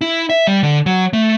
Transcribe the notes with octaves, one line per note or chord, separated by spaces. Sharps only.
E4
E5
G3
D3
F#3
A3